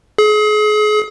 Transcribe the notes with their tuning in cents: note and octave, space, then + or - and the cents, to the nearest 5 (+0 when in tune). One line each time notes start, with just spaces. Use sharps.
G#4 +35